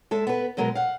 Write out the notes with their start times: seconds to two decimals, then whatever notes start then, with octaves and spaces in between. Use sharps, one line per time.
0.11 G#3 A4 E5
0.27 B3 B4
0.57 B2 F#3 G#3 B3 A#4
0.75 F5 F#5